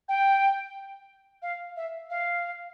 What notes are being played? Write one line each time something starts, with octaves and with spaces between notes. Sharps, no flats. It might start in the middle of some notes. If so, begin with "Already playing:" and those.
G5
F5
E5
F5